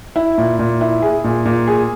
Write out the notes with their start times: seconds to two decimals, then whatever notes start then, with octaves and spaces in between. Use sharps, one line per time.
0.16 E4
0.38 A#2
0.59 A#2
0.81 E4
1.02 G#4
1.24 A#2
1.45 A#2
1.68 G#4